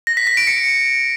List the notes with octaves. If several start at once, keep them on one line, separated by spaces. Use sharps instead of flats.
A#6
B6
B6
D7
C#7